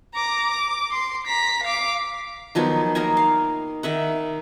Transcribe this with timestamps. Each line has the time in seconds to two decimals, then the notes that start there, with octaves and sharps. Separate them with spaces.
0.14 A#5 D6
0.50 D6
0.91 C6
1.27 A#5 B6
1.63 F5 D6
2.55 D#3 F3 F#3 B3
2.95 A#3 D#4 A#4 G#5
3.17 F5
3.83 D#3 E5 F#5